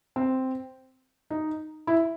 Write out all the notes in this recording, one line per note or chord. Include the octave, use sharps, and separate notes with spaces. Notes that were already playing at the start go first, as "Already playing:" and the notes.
C4
D#4
E4